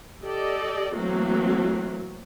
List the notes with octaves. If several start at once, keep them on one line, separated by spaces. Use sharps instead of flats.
G4 A4 D5 D#5
E3 F#3 A3 A#3 C4 F#4